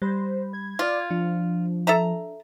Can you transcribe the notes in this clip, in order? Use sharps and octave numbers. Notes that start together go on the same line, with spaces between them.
G3 C5 B5
G#6
F4 D5 D6 F6
F3 D4
A4 E5 A#5